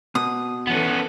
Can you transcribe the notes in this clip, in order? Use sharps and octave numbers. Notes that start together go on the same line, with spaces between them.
B2 D#6
E3 B3 C#4 A4